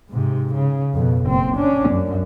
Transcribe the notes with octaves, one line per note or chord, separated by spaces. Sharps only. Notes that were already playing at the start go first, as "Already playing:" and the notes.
G#2 C3
C#3
F2 B2
F#1 C4
C#4 D4
F#2